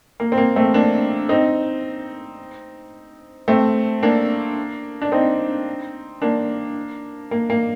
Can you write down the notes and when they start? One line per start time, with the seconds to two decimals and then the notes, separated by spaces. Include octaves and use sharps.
0.20 A#3
0.32 C4
0.38 A#3
0.56 A3 C4
0.74 A#3 D4
1.29 C4 D#4
3.48 A3 C4
4.03 A#3 D4
5.02 D4
5.12 C4 D#4
6.22 A#3 D4
7.31 A#3
7.50 A#3